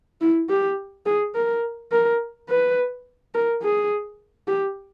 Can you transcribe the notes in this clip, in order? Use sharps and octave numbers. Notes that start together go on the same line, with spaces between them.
E4
G4
G#4
A#4
A#4
B4
A#4
G#4
G4